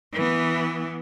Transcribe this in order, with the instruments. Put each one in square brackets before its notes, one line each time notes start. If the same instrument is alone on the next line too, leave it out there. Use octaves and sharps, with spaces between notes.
[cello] E3 B3